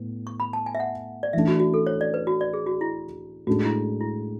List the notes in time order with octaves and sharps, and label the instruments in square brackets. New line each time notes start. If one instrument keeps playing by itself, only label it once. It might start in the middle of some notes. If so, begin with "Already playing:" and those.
Already playing: [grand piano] A2 B3
[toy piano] C#6
B5
A5
G#5
E5
F#5
D5
[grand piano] E3 A3 D4 [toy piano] E5
[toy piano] F#4
F#4
A4
C#5
D5
B4
F#4
D5
G#4
F#4
E4
[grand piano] A2 G#3 D4 [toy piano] F#4
[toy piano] E4
E4